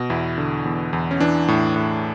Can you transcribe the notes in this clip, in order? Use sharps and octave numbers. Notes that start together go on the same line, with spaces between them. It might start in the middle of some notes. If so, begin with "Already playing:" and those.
Already playing: B2
E2 E4
D3
E2
E2
C#4
E3 D4
A2
A2